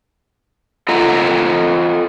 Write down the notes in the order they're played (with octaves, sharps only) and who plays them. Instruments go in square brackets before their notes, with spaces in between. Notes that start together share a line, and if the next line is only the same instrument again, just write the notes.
[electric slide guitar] F4 A4 D#5 F#5 A#5